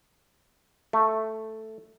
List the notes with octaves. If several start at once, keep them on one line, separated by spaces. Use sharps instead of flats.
A3